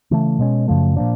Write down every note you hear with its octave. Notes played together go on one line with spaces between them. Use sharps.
C#3 E3 A3
B2 G#3 C#4
F#2 C#3 F3 A3
A#2 F3 A#3 D4